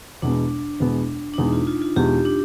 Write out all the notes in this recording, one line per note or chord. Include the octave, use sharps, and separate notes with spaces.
E2 B2 G#3 B3 D4
E2 B2 G#3 B3
D4
E2 B2 G#3 B3 D#4
F4
F4
F4
E2 B2 G#3 B3 F4 G4
D4